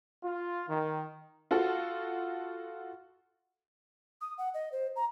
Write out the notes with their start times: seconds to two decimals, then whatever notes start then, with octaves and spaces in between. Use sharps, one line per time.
0.23 F4
0.68 D#3
1.51 F4 F#4 A4
4.21 D#6
4.38 F#5
4.54 D#5
4.72 C5
4.96 A#5